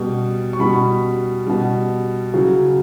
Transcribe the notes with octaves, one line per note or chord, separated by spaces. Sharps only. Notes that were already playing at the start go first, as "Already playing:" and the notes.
Already playing: B2 G3
C#6
B2 G3 B5
B2 G3
C#3 F#3